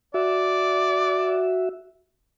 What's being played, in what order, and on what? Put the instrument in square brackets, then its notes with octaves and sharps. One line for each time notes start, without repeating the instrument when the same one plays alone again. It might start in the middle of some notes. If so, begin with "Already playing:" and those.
[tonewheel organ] F#4 E5 [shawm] D5